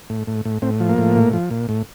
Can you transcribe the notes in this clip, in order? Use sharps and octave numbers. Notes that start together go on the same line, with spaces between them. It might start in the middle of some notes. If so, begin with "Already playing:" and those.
A2
A2
A2
A2 C4
F3
A#3
A2
A#2
F3
A#2
A2